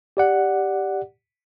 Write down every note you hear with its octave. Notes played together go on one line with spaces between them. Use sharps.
G4 D5 F#5